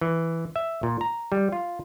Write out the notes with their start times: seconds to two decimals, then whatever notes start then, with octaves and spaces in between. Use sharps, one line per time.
0.01 E3
0.56 E5
0.83 A#2
1.01 A#5
1.32 G3
1.52 F4